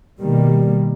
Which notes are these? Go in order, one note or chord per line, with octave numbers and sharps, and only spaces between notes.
B2 D#3 G3 A#3